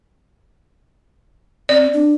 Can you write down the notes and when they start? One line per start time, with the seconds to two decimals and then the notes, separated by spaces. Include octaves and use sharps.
1.69 C4 D5
1.93 D4